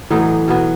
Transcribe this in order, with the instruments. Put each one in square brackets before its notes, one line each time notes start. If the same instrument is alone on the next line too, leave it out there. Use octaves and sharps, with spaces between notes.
[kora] A2 F#3 B3 D#4 [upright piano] E3
[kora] B2 F#3 B3 F#4